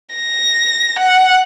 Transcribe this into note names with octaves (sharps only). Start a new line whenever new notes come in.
A#6
F#5